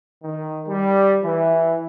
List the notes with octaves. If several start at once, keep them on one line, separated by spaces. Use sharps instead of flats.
D#3
G3
E3